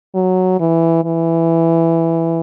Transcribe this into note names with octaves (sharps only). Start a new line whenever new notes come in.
F#3
E3
E3